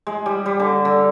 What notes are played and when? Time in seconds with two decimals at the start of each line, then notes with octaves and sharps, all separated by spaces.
0.07 G#3
0.26 G3
0.46 G3
0.60 D3
0.85 D3